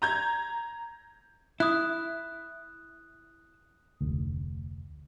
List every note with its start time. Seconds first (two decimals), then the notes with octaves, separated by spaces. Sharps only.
0.02 A#5 G6 G#6
1.60 E4 D#6 F#6
4.01 F1 D2